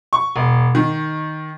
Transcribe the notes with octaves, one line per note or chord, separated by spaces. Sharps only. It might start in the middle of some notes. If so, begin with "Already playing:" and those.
C#6
E1
D#3